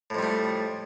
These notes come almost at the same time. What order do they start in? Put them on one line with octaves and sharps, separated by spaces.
A2 F2 G3 A3